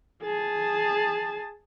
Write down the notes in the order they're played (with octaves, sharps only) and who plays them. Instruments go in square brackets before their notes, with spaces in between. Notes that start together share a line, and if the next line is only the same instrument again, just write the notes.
[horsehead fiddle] G#4 A5